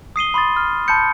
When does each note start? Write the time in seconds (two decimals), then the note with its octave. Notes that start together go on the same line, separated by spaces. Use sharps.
0.16 D#6 C7 D#7 G7
0.34 B5 C6 D#6 A6
0.56 F6
0.88 A5 B5 C6 G6 C#7